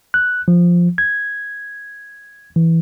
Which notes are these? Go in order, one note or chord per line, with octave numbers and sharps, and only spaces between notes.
F#6
F3
G#6
E3